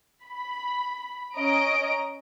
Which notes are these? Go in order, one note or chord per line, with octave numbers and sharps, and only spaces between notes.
B5
C#4 D#5 A#5 D7